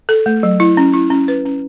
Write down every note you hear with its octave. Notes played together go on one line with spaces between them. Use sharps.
A4
A3
F#3
E4
C#4
E4
C#4
B4
C#4